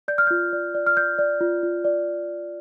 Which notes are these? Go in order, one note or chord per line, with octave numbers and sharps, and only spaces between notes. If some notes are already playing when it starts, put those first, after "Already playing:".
D5 G6
F6
F4 G6
D5
D5
F6
D5 G6
D5
F4
F4
D5